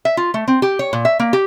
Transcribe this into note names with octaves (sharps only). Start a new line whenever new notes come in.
E5
F4
A3
C4
G4
C#5
A#2
E5
A#3
G4